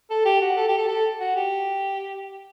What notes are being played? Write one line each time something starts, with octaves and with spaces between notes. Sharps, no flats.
A4
G4
F#4
A4
G4
A4
A4
F#4
G4